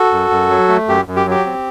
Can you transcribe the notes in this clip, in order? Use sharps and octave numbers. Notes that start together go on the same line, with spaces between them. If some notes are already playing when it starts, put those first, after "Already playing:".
Already playing: F#4 A4
F#2
F#2
F#3
A3
F#2 G4
F#2
G4
F#3 G4
C4